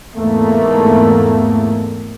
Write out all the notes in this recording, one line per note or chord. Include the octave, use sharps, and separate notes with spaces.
E2 G#2 A3 A#3